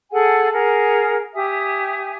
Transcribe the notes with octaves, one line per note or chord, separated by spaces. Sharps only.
G#4 A4 F#5 G#5
G#4 A#4 F#5
G4 E5 G#5 D#6